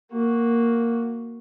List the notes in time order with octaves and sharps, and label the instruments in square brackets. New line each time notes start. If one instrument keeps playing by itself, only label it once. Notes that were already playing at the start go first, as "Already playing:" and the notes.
[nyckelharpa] A#3 F#4